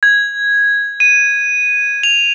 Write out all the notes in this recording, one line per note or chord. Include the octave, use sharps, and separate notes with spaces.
G#6
D#7
F7